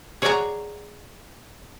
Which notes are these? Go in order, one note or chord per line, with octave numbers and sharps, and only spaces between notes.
G#4 C#5 D5 F#5 G#5 A#5